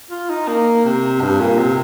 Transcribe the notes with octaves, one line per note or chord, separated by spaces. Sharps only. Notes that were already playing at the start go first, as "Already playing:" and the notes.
F4
D#4
A#3
C3
G2
A#2
C3